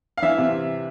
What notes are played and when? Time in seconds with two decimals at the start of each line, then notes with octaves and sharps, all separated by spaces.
0.17 F5
0.22 E3 E5
0.38 C3